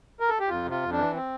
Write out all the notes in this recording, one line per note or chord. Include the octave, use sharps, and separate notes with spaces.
A#4
A4
G4
F2 F4
C3
F4
F2
D4
E3
C4